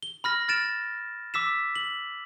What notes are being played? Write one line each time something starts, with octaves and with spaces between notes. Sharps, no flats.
G7
B5 F6 A#6
F6 A6 D7 E7
D6 E6 B6 E7
F#7